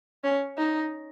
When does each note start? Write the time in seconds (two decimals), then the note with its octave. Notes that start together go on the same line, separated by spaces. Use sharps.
0.24 C#4
0.58 D#4